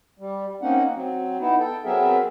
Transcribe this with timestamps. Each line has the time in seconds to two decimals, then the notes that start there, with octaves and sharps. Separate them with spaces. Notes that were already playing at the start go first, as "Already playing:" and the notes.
0.19 G3
0.62 A#3 C4 C#4 D#4 F#5
0.93 F#3 C4
1.40 B3 D#4 E4
1.59 A4 G5
1.85 F#3 B3 C4 G#4 A#4 E5